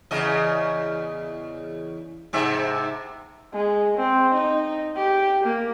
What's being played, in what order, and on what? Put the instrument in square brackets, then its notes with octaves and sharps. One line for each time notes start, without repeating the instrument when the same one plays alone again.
[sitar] E2 C#3 D#5
G#2 C3 E5
[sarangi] G#3
C4
D#4
G4
A#3